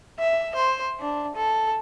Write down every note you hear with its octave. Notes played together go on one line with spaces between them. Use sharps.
E5
C5
D4
A4